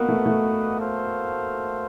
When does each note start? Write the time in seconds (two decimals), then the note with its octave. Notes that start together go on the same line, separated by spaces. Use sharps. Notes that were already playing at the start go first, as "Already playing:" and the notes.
Already playing: A#3 B3 F#4 B4 D#5 F#5
0.09 A3
0.26 A3
0.78 F#4 A4 C5 F5